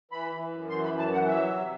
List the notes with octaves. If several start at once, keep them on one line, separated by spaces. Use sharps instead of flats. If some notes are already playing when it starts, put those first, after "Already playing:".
E3 B5
E3
F#2
E3 C6
B5
F#2
A5
E3 F#5
F#3 E5
C3